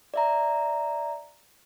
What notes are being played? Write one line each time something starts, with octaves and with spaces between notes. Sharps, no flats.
D5 E5 A#5